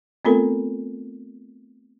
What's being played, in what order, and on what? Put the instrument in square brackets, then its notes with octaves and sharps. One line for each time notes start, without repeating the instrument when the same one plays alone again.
[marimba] A3 B3 C4 F4 A4 A#4